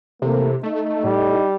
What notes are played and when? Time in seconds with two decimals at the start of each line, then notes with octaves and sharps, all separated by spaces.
0.22 C3 E3 A3 A#3
0.63 A3 D#4 D#5
1.04 A2 G3